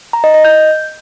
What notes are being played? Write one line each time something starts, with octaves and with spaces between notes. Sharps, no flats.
A#5
D#5
D#5
G6